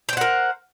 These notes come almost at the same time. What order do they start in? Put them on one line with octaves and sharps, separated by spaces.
G5 C5 F#5 A#4